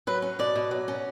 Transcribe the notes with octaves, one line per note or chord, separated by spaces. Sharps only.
F#3 B4
C#4
B2 D5
B2
F#3
C#4